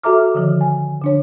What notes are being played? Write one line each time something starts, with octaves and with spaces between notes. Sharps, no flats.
F#4 A4 E5 A#5 D6 F6
D3 D#3 F3
G#5
D3 D4 C#5